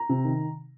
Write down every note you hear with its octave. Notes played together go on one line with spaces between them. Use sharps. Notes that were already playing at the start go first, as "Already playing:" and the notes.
Already playing: A#5
C3
D#3